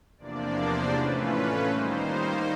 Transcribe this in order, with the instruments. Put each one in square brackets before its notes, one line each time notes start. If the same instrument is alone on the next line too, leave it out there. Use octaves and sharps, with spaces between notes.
[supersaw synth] E2 C3 F3 A#3 D4 D5
C5
A2 E3 A3 C#4 F4 B4
D#3 G3 A#3 D#4 C5